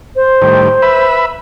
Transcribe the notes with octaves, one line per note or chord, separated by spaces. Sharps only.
C5
A2 D#3 G3
B4 E5 B5